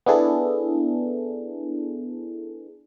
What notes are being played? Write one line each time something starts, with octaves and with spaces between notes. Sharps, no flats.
B3 D4 E4 G#4 A4